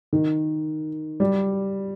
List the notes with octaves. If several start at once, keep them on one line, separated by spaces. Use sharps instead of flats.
D#3
G3